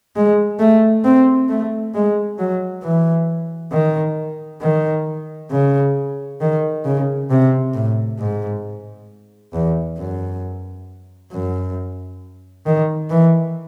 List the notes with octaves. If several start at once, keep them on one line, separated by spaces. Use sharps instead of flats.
G#3
A3
C4
A3
G#3
F#3
E3
D#3
D#3
C#3
D#3
C#3
C3
A2
G#2
E2
F#2
F#2
D#3
E3